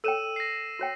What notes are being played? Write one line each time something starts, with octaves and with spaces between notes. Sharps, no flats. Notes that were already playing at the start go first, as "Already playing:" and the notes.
A4 C#5 G5 E6 D#7 E7
A#6 C7
F#4 C#5 G5